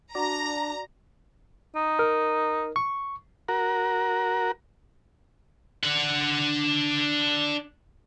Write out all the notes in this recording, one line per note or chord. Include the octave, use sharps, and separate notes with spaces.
D4 F#4 D5 A#5
D#4
A#4
C#6
F#4 A#4
D4 F#5